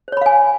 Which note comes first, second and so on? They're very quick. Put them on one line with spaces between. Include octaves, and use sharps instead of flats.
C5 C#5 B5 F5 G#5